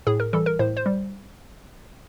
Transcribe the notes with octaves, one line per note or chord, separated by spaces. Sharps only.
A2 G#4
A#4
E3 G3 A4
A#4
A2 C5
C5
G3